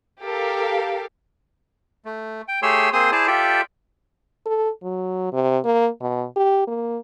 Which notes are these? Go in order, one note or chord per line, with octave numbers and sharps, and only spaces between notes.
G4 A4 A#4 F5
A3
G5
A3 G4 G#4 C#5 C6 E6
A#3 C4 G#4 C5 C6 D#6
E4 G#4 C5 D5 A5
F4 G4 A4 D5 E5 G5
A4
F#3
C3
A#3
B2
G4
A#3